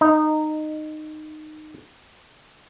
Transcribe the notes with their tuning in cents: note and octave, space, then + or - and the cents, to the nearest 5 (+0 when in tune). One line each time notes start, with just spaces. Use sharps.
D#4 -15 D#5 +0